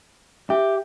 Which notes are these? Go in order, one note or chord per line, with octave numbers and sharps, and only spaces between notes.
G4 E5